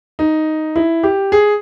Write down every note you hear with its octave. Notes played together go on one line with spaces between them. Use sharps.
D#4
E4
G4
G#4